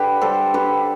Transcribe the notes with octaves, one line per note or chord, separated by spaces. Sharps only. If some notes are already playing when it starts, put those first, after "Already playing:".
Already playing: D3 G4 B4
G3 A4 C5
D3 G4 B4